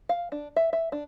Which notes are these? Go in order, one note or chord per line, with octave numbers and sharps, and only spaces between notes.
F5
D4
E5
E5
D4